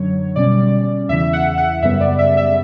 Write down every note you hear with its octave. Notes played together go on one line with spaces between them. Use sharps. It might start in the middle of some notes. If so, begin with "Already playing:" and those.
Already playing: F#2 D3 F#3 C#5
B2 G3 C#4 D5
E2 C#3 E3 E5
F#5
F#5
F#2 C#3 G3 B3 E5
D5
E5
E5